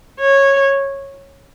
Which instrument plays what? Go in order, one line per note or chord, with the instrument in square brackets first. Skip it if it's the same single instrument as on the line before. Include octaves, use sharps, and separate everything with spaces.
[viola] C#5